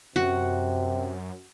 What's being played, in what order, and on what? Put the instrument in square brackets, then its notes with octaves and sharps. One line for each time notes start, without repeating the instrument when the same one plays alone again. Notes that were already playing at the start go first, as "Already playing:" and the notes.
[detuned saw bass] F#2 [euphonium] C3 [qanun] F#4